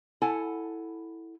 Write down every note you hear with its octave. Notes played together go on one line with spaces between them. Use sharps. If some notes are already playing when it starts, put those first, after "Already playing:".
E4 A4 F#5 G#5 A5